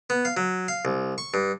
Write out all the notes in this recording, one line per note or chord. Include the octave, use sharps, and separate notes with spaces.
B3
F5
F#3
F5
C2
C#6
G2